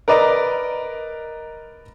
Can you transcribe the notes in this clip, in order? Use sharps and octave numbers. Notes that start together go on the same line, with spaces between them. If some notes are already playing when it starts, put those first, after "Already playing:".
A#4 B4 D5 D#5 A#5